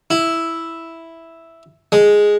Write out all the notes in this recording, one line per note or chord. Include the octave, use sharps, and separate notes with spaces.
E4
G#3